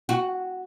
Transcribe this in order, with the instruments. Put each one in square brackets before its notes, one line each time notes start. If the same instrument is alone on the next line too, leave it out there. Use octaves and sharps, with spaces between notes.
[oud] F#4